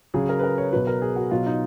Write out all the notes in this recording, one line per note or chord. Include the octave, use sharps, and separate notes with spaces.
C#3 F#3 G#4
A#4
B4
A#4
C#5
B2 F#3 B4
A#4
G#4
F#4
B2 F#3 F4
D#4